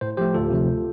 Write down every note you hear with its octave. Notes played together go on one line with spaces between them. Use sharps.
A2 C5
F3 A3 G4 C5
D2 F4 A4
C3 F3 A3